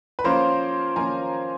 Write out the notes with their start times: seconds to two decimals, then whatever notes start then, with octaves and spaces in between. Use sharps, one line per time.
0.19 B4
0.24 F3 A#3 C#4 F4 A#4 C5
0.96 F3 A#3 C#4 F4 G#5 A#5